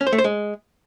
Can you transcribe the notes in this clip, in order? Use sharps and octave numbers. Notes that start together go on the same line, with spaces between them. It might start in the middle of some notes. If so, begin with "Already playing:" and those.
C#4
C5
A3
C5
G#3